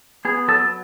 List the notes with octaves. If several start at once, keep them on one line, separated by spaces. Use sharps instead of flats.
B3 G#4
F#3 A4